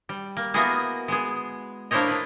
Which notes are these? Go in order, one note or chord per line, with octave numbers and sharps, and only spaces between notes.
G3
A#3
A#3 B3 E4 F#4 G#4
G#3 B3 G#4
A#3 D4 E4 C5 C#5 D#5
D4 B4